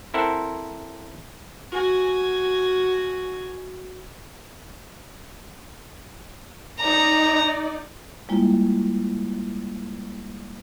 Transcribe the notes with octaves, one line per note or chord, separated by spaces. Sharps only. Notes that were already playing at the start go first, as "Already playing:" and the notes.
C4 E4 A4 A#4 C5 F#5
F#4 G#5
D#4 D5 A#5
G3 G#3 A#3 E4 F4